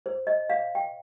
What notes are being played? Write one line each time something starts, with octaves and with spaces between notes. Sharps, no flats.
C5
D#5
F5
G5